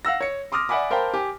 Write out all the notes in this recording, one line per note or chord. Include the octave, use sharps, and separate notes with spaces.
F5 F#5 E6 A#6
C#5 C#7
C6 D6 D#6 F6 A#6
D5 E5 F#5 G#5 B5 D6
A#4 C5 F5 G5 A5 B5
G4 G#5